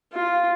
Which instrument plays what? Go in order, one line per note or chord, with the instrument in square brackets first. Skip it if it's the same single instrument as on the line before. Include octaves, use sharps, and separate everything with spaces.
[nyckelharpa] F4